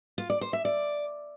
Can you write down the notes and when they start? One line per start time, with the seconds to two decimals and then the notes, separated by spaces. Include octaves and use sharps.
0.18 F4
0.30 D5
0.41 C5
0.53 E5
0.65 D5